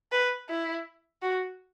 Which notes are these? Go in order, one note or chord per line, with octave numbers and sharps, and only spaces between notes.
B4
E4
F#4